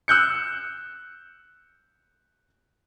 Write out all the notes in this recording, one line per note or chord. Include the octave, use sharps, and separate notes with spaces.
E6 F#6 G6 C#7